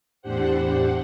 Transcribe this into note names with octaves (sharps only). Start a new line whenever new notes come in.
E2 A2 D4 G4 C5 F#5